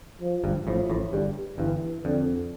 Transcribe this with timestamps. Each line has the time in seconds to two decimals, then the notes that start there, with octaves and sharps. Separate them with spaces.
0.21 F3
0.43 G1 G2
0.66 A1 A2 F3
0.90 A1 A2
1.12 G1 G2 G3
1.58 G1 G2 E3
2.04 F2 D3